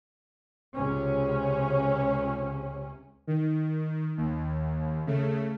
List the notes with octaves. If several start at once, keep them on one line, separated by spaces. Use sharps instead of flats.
C#2 C3 C#4
D#3
D#2
C#3 A3